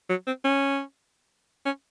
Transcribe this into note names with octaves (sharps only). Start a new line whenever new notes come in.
F#3
C4
C#4
C#4